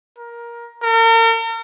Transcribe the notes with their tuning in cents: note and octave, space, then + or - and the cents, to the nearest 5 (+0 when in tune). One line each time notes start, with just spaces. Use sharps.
A#4 +15
A#4 -40